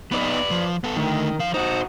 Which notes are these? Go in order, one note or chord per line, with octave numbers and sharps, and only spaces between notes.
B3 D#4 B4 D5
F3
B3 A4
D3 D#3 A3
F3 F5
D#4 F#4 C5